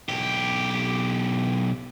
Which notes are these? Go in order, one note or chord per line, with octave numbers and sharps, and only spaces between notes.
B1 G4